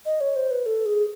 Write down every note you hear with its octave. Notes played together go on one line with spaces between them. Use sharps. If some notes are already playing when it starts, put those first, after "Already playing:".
D#5
C#5
C5
B4
A4
G#4